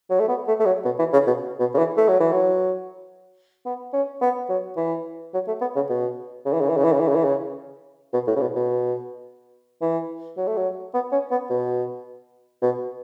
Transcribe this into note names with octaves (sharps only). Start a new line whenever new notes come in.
F#3
A3
B3
A3
A3
F#3
B2
E3
C#3
B2
B2
C#3
E3
A3
F#3
E3
F#3
B3
C#4
B3
F#3
E3
F#3
A3
B3
C#3
B2
C#3
E3
C#3
E3
C#3
E3
C#3
E3
C#3
E3
C#3
B2
A2
C#3
B2
B2
E3
F#3
A3
F#3
B3
C#4
B3
B2
B2